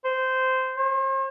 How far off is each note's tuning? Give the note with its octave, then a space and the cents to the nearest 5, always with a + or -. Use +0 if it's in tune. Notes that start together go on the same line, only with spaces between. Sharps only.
C5 -10
C5 +45